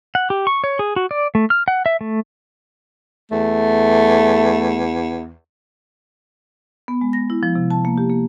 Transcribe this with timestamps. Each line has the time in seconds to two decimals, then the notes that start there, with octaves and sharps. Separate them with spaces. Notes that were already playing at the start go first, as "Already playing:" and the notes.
0.15 F#5
0.30 G4
0.47 C#6
0.64 C#5
0.79 G#4
0.96 F#4
1.11 D5
1.35 A3
1.50 F6
1.68 F#5
1.86 E5
2.01 A3
3.31 E2 A3
6.88 B3
7.01 G#3
7.13 A#6
7.30 E4
7.43 F3
7.55 C3
7.70 A5
7.85 A#3
7.98 G4
8.10 A#3